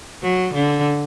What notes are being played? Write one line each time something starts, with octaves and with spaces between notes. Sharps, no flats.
F#3
D3